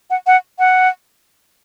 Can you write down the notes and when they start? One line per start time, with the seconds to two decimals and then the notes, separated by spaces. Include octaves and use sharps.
0.10 F#5
0.27 F#5
0.59 F#5